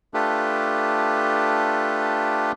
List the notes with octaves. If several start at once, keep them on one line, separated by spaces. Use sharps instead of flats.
A3 D4 F4 G4 A4 B4